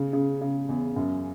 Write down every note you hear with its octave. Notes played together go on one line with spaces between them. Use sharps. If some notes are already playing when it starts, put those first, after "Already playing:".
Already playing: C#3
C#3
C#3
E2
F#2